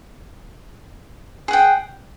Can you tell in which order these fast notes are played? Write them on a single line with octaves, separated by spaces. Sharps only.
G#4 F#5 G5